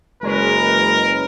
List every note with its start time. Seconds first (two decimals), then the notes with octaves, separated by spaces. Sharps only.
0.23 F#1 G#3 C#4 A#4 B4